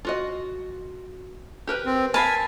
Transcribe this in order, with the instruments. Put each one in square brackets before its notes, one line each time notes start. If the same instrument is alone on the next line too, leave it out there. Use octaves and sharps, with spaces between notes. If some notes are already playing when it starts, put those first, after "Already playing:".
[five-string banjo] F4 F#4 D#5
G4 A#4 B4
[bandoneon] C4
[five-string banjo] A#4 F5 [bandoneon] G#5 [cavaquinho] A5 B5